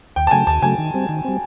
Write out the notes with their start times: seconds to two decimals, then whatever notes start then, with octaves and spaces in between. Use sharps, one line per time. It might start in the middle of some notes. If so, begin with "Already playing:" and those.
0.16 D#2 G5
0.27 A5
0.31 C#3 F#3 A3 G#5
0.47 D#2 A5
0.62 C#3 F#3 A3 G#5
0.78 D#3
0.94 G3 C4
1.09 D#3
1.25 G3 C4